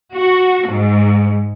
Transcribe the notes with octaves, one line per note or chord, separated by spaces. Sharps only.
F#4
G#2